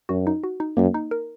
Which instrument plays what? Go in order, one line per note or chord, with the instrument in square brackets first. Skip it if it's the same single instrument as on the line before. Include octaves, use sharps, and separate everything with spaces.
[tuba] F#2 [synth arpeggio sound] F#4
[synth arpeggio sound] D#4
F#4
D#4
[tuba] F#2 [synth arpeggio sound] A#3
[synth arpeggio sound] D#4
A#4